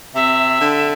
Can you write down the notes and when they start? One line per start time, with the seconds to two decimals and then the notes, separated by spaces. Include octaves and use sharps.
0.14 C3 E5
0.61 D3